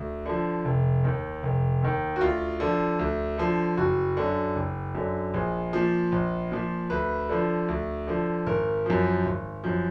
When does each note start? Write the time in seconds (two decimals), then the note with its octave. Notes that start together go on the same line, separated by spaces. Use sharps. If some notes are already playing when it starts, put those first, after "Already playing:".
Already playing: D2
0.26 D3 F3
0.65 F1
1.04 D#2 D#3
1.43 F1
1.82 D#2 D#3
2.16 F#4
2.21 D2 F4
2.60 D3 F3
2.99 D2
3.38 D3 F3
3.77 F#1 F#4
4.17 F#2 D3
4.56 F#1
4.95 F#2 D3
5.34 A#1 G#4
5.73 A#2 F3
6.12 A#1
6.52 A#2 F3
6.90 D2 B4
7.29 D3 F3
7.68 D2
8.07 D3 F3
8.46 G#1 A#4
8.86 F#2 F3
9.25 G#1
9.64 F#2 F3